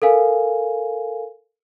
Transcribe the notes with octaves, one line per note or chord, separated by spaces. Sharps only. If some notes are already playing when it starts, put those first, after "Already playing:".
A4 A#4 F5 G#5